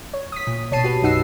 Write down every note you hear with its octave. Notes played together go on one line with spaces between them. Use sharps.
C#5
D#6 B6
A#2
G#1 B2 C#5 A5 C7 D#7
F#4 G4 B4
B1 F#2 D#4 F#5 E6 C7